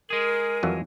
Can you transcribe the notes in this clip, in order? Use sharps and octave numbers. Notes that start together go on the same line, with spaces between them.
G#3 G#4 A#4
F2 E3 F#3